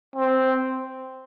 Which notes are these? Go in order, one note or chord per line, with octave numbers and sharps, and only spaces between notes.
C4